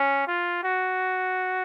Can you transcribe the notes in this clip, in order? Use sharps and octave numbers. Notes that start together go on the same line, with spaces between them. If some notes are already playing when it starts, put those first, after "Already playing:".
Already playing: C#4
F4
F#4